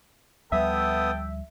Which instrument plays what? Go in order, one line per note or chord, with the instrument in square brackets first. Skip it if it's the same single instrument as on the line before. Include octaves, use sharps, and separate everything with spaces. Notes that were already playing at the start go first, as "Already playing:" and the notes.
[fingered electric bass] D2 F3 G3 [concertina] B3 D#6 [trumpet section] A4 G5 [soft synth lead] E5